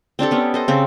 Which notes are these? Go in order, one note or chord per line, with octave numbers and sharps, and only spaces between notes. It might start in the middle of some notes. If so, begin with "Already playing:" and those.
C4 D4 G4 A4
B3 C#4
A4 C5 D#5
C#3 C4